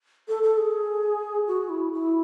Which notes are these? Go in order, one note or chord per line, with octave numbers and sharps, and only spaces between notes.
A4
A4
G#4
F#4
E4
E4